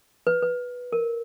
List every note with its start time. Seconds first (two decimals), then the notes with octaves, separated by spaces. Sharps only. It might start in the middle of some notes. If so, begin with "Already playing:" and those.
0.27 B4
0.43 B4
0.92 A#4